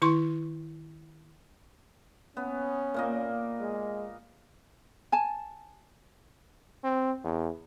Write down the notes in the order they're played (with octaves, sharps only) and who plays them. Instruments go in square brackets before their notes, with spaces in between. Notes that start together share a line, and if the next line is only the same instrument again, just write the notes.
[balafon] D#3 E4 C6 C#6
[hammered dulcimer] B3 [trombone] C#4
[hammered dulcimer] A#2 A#3 D#5
[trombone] G#3
[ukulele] G#5 A5
[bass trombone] C4
E2